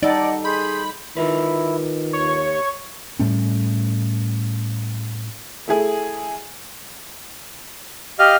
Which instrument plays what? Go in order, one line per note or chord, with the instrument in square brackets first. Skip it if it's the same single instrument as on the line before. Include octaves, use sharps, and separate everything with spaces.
[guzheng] G3 A4 [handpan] D#4 [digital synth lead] D5 [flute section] D#5 F#5
[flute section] G#4 C6 G6 [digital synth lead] B5
[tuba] D#3 [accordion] E4 [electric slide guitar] F4 A#4 B4
[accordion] D#2 [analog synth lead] C#5
[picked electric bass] A2 G3 A3 C#4
[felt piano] A3 E4 G#4
[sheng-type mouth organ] G4 D#5 F6 [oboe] F5